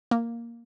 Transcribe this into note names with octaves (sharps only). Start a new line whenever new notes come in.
A#3